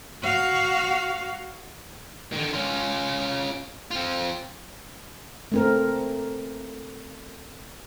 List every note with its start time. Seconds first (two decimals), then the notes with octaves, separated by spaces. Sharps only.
0.22 F#4 F5
2.32 D3 D#3
2.53 C#4 F4
3.91 C4 F4
5.52 A3 C4 A#4